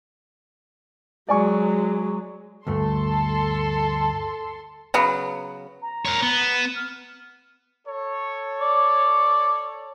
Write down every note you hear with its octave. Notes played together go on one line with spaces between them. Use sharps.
F#3 G#3 D5 G#5 C#6
D2 G2 A3 A4 C6
C#3 F#3 B3
A#5
A#4 C#5
B3
E7
F6
A4 C#5
D5